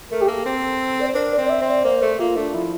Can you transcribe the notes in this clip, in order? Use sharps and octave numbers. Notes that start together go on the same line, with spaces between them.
A3 A#4
G4
A#3 A4
C4
D5
C5
D4 A#4
D5
C4
D5
E5
C4
D5
A#3 C5
A3 A4
A#3 F4
A3 D4
F3 E4